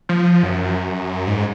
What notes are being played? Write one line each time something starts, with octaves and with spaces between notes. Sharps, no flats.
F3
F#2
G#2